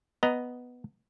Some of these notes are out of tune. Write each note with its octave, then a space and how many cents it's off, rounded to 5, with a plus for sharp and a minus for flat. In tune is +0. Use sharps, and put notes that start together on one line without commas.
B3 +0 D#5 +0 A#5 +0